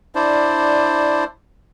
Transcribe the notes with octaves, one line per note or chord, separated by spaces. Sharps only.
D4 E4 C5 D5